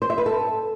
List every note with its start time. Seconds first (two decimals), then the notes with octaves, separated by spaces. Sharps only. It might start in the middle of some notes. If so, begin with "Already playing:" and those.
0.02 C5
0.10 E5
0.18 B4
0.26 A4